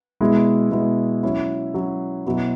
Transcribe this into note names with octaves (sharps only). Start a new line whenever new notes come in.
B2 G#3 E4
B2 G#3 E4
F#3 C#4 E4
F#3 C#4 E4
B2 F#3 E4